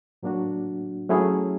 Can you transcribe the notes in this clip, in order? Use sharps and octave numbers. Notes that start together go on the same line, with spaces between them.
A2 F#3 A#3 D4 F#4
F#3 A3 C#4 E4 G#4